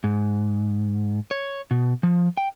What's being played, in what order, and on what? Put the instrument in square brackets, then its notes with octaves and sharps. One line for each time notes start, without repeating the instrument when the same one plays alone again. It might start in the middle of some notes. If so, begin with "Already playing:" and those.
[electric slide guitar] G#2
C#5
B2
F3
G5